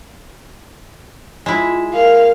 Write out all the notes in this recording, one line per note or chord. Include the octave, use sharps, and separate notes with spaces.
G#3 E4 F4
A#4 F5